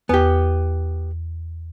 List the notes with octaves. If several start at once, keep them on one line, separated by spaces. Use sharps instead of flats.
E2 B3 G4